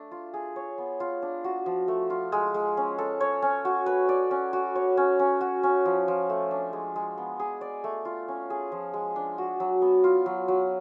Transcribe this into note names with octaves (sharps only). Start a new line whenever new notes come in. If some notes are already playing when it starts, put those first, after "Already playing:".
Already playing: A3 D4
F4
G#4
C#5
B3
F4
D4
F#4
F3
A3
F4
G#3
G#3
C#4
A4
C#5
C#4
F#4
B4
D5
C#4
F#4
C#5
C#4
C#4
F#4
C#4
F3
F3
A3
D4
G#3
G#3
B3
G#4
D5
A3
F4
C#4
G#4
F3
G#3
D4
F#4
F#3
B3
F4
F#3
F#3